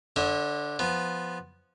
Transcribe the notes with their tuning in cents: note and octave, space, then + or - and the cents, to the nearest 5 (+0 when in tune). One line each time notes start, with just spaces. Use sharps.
D3 +0 C#5 -45 E5 -45
F3 +0 B3 +0